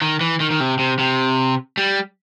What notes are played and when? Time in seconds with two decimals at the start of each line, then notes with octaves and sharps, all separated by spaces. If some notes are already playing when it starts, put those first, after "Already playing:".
0.02 D#3
0.21 E3
0.40 D#3
0.51 D#3
0.60 C3
0.79 C3
0.99 C3
1.77 G3